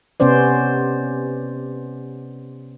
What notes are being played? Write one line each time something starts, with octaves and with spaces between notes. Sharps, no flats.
C3 B3 C#4 C5 D5